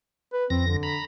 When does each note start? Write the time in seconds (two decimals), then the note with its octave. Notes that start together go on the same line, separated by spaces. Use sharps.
0.33 B4
0.50 F2 C4 A#6
0.67 D3
0.83 A#5 B5